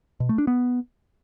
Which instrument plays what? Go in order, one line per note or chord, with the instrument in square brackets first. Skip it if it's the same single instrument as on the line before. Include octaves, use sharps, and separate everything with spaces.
[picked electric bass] B2
A3
D4
B3